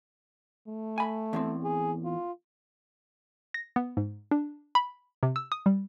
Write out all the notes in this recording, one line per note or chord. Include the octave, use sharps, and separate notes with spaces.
A3
G#5 B5
E2 A2 C4
G#4
F4
A#6
B3
G#2
D4
B5
C3
E6
D#6
G3